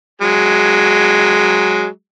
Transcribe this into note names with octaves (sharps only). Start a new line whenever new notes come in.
F#3 G#3